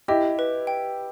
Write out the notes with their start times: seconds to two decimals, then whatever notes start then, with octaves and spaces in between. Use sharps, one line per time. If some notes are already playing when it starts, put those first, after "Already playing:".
0.08 E4 G4 D#5
0.39 B4
0.67 G5